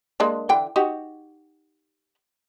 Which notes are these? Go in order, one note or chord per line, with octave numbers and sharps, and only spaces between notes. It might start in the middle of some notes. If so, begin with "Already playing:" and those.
G#3 A#3 D4
D3 E3 G5
D#4 F#4 G4